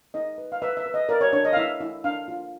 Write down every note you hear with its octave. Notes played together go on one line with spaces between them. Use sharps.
D#4 D#5
B4
F5
B4 E5
E5
B4
D#5
A#4 D5
C#5
D4 C#5
D#5
F5
E4 E5
E4
D4 F5
F4